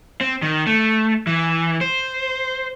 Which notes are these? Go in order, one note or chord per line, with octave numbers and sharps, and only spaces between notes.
C4
D#3
A3
E3
C5